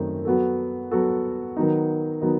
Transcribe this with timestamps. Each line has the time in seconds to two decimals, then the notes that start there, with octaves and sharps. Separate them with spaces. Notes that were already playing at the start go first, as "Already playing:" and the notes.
Already playing: F#2 D#3 A3 C4 D#4
0.25 F#3 B3 F#4 A4
0.91 F#3 B3 F#4 A4
1.57 D#3 F#3 B3 D#4
2.22 D#3 F#3 B3 D#4